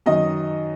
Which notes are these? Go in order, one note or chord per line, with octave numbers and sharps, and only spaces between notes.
F#2 D#3 D#5